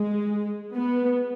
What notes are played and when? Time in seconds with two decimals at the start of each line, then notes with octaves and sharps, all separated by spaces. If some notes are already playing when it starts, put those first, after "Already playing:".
Already playing: G#3
0.75 B3